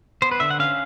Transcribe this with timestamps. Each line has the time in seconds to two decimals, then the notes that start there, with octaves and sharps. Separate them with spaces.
0.22 B3 C5
0.31 B4
0.40 D3 E5
0.50 F#5
0.59 C#4 F5